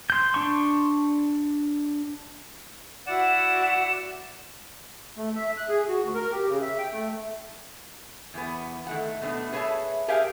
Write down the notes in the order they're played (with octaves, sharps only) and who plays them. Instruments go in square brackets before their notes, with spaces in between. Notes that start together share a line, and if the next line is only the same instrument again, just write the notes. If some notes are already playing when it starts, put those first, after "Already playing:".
[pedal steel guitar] C6 G6
D4 C6 C#6
[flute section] E4 F#4 [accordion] D5 F#5 [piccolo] E7
[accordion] A3
E5
F#6
G#4
F#4
D2
A#4
G4
C#3
E5
G5
A3
[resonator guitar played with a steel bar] E2 B3
D#3 A3 F#5
B2 A3 B3 D4
G#4 B4 C#5 D5 E5 A5
G4 G#4 A#4 E5 F5 G5